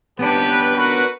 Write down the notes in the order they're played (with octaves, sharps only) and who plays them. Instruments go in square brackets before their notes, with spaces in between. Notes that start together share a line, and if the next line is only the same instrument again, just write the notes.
[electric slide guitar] B3 C#4 D4 [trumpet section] G4 B4
[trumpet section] F#4 A#4 B4